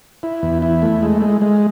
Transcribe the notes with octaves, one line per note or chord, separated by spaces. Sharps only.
E4
E2
E4
A3
G#3
G#3
G#3